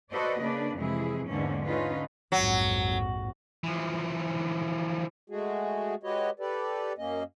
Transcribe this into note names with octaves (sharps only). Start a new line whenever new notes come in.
F#4 A4 B4 C5 D5 D#5
C#3 A#3 D4 B4 D5
F2 C3 E3 G#3 E4 G#4
E2 G#2 D3 E3 A#3 C#4
D3 C#4 D#4 F4 B4
A#1 F2 G#2 F#3
E3 F3
G#3 A3 F#4 G#4
G#3 F#4 G4 B4 C#5 D#5
G4 A4 B4 D5
F#2 A#3 C#4 D#5